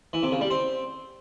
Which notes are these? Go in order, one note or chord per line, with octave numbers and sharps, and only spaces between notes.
E3
C3
C#3
G3
C4